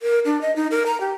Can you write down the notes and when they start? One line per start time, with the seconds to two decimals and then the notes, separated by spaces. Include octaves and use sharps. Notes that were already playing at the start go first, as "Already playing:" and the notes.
0.02 A#4
0.25 D4
0.41 D#5
0.56 D#4
0.71 A#4
0.86 A#5
1.01 G4